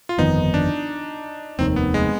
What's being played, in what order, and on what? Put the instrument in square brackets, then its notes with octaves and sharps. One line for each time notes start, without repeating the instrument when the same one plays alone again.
[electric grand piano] F4
[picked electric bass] G1 F2 D#3 B3 [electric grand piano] D#4
[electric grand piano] D4
[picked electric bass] F1 D#2 D#3 [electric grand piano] C4
[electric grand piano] B3
G#3